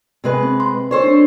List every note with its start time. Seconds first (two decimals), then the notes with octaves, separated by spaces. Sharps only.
0.24 C3 G#3 B4
0.43 C4
0.60 C6
0.91 A4 C5 C#5
1.04 D4